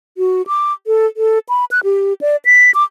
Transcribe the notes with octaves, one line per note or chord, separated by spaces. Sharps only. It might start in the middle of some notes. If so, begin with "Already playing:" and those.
F#4
D6
A4
A4
B5
F#6
G4
D5
B6
D6